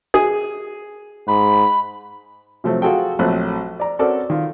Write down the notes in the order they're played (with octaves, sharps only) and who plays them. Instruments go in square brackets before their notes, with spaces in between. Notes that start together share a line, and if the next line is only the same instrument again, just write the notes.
[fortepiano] G#4
[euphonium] G#2 [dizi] B5
[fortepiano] C3 F3 F#3 A3 C4
F4 F#4 G#4 A4 G5
A#1 F#3 A3 C4 F#6
D5 A#5
C4 C#4 F#4 A4 A#4 D5
D#3 F4